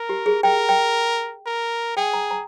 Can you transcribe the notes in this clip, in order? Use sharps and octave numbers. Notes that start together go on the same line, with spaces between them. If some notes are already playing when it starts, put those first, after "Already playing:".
Already playing: A#4
G4
G#4
A#4 G5
G5
A#4
G#4 G5
A#5
A#5